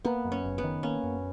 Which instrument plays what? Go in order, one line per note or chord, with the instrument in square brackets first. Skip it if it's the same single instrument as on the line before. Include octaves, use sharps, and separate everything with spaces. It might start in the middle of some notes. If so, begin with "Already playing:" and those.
[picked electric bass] A#3 [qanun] B3
[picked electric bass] F#2
[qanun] C#4
[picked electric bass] F#1
[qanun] B3
[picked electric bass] D#3
[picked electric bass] A#3 [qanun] C#4
[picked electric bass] F#2